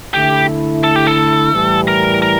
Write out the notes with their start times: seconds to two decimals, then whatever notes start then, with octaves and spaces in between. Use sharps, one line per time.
0.14 D3 A3 E4 G4
0.84 A4
0.96 G4
1.07 A4
1.53 A2 E3 G3
1.88 A#4
2.22 A#4